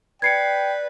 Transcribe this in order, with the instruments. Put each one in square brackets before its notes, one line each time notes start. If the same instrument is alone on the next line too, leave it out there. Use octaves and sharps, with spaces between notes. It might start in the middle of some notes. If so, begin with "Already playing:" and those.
[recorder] B4 [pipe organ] D5 [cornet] G5 [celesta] G#6 C7 C#7